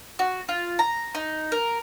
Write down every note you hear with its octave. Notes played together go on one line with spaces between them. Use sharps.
F#4
F4
A#5
D#4
A#4